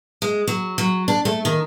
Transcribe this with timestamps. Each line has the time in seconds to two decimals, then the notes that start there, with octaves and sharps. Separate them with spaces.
0.22 G#3
0.47 F#3
0.78 F#3
1.08 D4
1.25 A3
1.45 D#3